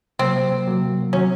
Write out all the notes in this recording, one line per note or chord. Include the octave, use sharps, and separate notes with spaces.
C3 F#3 A#3 C4
C3 F#3 A#3
D#3 F#3 C4 C#4 F#4